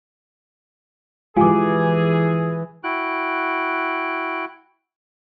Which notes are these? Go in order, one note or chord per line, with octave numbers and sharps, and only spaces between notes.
E3 G#3 F4 G4 G#4 G#5 D6
E4 F#4 G5 F#6